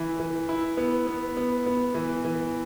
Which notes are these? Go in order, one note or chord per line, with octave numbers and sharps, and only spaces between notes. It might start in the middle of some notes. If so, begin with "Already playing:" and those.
Already playing: E3 E4
E3
E4
B3
B3
B3
B3
E3
E3